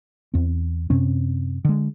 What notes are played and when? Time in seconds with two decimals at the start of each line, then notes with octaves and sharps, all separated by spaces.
0.34 E2 C4
0.90 F#2 C3 C4 C#4
1.65 D3 G#3